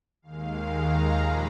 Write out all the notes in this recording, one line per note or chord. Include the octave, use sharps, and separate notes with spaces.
D#2 D#3 G#3 F5
A#5
A#2 F3 G#3 B5